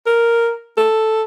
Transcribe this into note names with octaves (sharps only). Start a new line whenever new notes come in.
A#4
A4